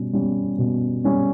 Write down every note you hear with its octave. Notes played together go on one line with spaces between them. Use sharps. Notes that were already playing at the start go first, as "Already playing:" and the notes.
Already playing: B2 G3 C#4
G3 C#4
B2
G3 C#4